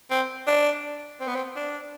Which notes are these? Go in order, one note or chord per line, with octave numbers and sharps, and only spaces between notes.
C4
D4
C4
B3
C4
D4